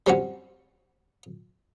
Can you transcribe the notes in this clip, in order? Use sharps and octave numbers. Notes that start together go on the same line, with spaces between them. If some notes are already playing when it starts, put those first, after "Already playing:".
G3 C4 C#4 F#4